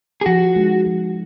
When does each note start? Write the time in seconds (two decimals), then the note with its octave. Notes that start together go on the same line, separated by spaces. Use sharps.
0.21 G#4
0.26 F3 F#4
0.56 G#3 D#4
0.87 F3